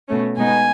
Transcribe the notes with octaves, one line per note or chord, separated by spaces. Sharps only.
B2 A3 C#4
B2 G#3 B3 D#4 G#5